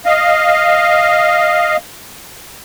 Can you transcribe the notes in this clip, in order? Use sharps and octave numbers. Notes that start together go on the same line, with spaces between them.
D#5 F5